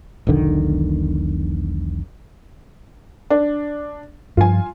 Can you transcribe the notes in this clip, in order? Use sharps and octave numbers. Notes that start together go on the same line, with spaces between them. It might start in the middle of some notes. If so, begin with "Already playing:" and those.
E1 B1 D3 D#3
D4
G2 F3 F4 G#5